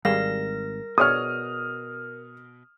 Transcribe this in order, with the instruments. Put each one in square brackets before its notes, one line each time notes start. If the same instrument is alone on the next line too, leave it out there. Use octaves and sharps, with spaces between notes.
[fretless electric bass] G#1 [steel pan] G3 G#4 F5 [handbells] A#4 A#6
[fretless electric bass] B2 [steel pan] G#4 C#5 D5 [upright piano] D#6 F6